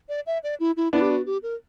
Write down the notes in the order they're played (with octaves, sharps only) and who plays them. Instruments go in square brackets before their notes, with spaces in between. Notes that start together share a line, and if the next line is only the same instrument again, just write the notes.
[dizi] D5
E5
D5
E4
E4
[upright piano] B3 D4 [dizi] E4
[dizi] G4
F#4
G4
A#4